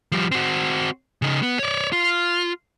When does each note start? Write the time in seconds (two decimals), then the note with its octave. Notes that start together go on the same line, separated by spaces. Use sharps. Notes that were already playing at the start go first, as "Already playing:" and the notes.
0.12 F3 G3
0.32 C4 F#4
1.22 C#3 D#4
1.43 B3
1.59 C#5 D5
1.92 F4